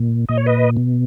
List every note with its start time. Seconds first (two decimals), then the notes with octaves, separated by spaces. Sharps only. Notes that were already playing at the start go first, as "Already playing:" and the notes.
Already playing: A#2
0.29 A#2 D#5
0.37 C#5
0.46 B4 D#5
0.77 B2